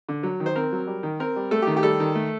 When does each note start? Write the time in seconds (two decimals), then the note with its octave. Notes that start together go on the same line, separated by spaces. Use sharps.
0.09 D3
0.23 F#3
0.40 D#3
0.46 C5
0.56 C4 A#4
0.72 F#3
0.87 G3
1.03 D#3
1.20 C4 A#4
1.36 G3
1.51 A3 A4
1.62 G4
1.67 D#3
1.77 G4
1.83 G3 A4
2.00 D#3
2.15 A3